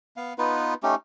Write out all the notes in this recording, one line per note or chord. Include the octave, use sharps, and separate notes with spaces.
B3 F5
B3 D#4 F4 B4
A3 C#4 D#4 G4